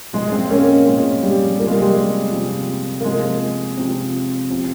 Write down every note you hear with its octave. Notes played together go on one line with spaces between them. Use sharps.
A#2 F3 G#3
G#3 C4
A#3 C#4
A#2 F3 G#3
G3
C3 F3 A#3
G#3
G3
G#3
C3 F3
A#3
C3 F3 G#3
C3 F3
C3 F3